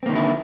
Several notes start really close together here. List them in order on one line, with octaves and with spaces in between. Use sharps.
C4 A#3 D#3 D3 E4